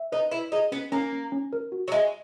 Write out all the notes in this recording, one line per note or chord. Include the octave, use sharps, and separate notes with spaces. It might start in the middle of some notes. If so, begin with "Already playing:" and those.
Already playing: E5
D#4 B4
E4 B4
D#4 G#4
B3 C#4
A#3 C#4
C#4
C#4
A#4
F#4
F#3
G#3 E5